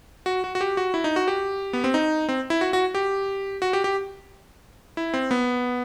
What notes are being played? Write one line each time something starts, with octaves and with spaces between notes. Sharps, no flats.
F#4
F#4
F#4
G4
F#4
E4
D#4
F#4
G4
B3
C4
D#4
C4
E4
F#4
F#4
G4
F#4
G4
G4
E4
C4
B3